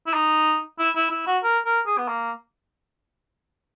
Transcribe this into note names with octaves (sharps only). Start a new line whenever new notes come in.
E4
D#4
E4
E4
E4
F#4
A#4
A#4
G#4
B3
A#3